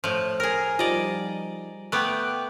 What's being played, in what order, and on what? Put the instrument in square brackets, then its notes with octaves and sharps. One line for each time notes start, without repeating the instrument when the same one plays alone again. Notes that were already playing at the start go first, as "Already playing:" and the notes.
[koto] A2 F3
G#4 A#4
[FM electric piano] F3 G3 D#4 [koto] D5 D#5
[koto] A3 B3 [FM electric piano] G5 D6 F#6